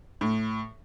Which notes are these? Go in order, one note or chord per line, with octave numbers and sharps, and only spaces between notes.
A2